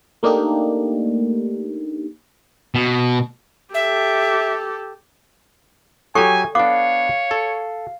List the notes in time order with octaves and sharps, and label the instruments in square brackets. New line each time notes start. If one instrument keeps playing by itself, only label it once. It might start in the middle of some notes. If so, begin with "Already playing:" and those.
[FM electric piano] A3 A#3 D4 D#4 G4
[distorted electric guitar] B2
[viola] G4 A4 [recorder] E5
[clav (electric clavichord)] F#3 G4 [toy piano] A4 G5 C#6 [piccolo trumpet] G#5
[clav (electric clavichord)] B3 D4 [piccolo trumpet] C#5 [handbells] F5 [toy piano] D6
[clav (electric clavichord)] A4